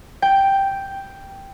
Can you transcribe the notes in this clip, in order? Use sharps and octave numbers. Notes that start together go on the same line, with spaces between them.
G5